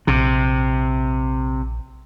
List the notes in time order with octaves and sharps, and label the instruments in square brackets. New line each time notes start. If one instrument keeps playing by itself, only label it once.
[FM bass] A#1 [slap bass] C3